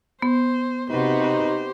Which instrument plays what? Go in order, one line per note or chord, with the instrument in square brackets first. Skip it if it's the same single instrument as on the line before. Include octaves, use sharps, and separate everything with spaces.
[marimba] B3 [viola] C5
[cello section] C3 F#4 B4 [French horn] D#4 [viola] G4 C5